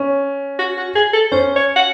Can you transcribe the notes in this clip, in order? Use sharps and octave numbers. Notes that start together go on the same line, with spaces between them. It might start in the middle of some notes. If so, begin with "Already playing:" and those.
Already playing: C#4
F#4
F#4
G#4
A4
C#4 C5
C#5
F#5